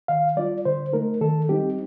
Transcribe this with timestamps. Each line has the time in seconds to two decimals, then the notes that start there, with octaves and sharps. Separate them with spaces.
0.08 D#3 F5
0.36 G3 D4 F4 D5
0.65 D3 C5
0.93 A3 D#4 A#4
1.21 D#3 A4
1.49 G3 C4 D#4 G4